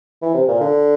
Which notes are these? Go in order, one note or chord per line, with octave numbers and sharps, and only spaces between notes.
E3
C3
A#2
D3